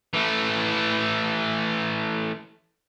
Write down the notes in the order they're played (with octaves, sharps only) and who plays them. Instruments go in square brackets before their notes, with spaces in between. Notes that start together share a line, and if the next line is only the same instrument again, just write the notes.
[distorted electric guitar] E3 A3